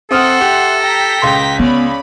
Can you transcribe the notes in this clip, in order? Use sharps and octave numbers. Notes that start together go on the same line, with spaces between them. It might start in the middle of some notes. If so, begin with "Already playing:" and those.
C4 A4 E5 F#5 C6 D#6 F6
G4
G5 A#5 B6
C#2 C6
B3 C#4 D5 B5